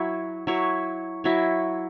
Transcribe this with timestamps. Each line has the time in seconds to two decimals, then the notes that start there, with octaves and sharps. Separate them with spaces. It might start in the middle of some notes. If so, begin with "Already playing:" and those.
Already playing: F#3 E4 C#5
0.47 F#3 E4 C#5
1.24 F#3 E4 C#5